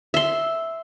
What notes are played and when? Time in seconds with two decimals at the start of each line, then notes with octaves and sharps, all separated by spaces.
0.14 E5 C6